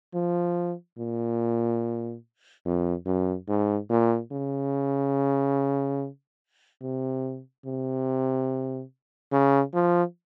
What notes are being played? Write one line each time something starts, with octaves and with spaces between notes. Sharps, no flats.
F3
A#2
F2
F#2
G#2
A#2
C#3
C3
C3
C#3
F3